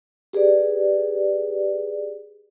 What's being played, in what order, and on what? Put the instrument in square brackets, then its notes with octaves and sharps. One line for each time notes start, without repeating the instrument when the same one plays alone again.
[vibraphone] G4 G#4 B4 D5